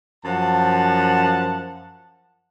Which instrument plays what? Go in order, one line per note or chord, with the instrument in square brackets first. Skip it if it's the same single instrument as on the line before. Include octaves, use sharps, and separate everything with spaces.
[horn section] F#2 F3 F#5 A5